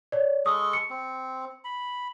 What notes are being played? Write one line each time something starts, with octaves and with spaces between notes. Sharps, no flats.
C#5 D5
G#3 A4 C#6 D#6
C#7
C4
B5